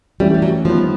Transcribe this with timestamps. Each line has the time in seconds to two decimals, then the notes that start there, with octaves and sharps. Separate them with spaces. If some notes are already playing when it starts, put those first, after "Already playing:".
0.20 E3 G3 A3 C#4
0.34 G3
0.42 F#3
0.65 D#3 F3 G3 B3